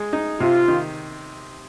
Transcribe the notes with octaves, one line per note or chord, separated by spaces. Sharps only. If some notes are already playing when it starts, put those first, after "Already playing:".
Already playing: G#3
D#4
C3 F4
D#3